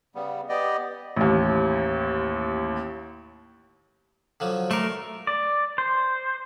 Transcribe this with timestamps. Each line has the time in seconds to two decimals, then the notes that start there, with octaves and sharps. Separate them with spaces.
0.15 C#3 G3 B3
0.49 B3 G4 D5 D#5
1.16 A1 D#2
4.40 D3 F3 F#3
4.71 A3 A#4 D5 C6 C#6
5.27 D5
5.78 C5